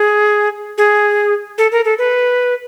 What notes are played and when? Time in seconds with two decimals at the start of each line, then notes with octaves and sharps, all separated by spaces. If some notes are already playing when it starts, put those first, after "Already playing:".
Already playing: G#4
0.78 G#4
1.58 A4
1.72 A#4
1.85 A4
1.98 B4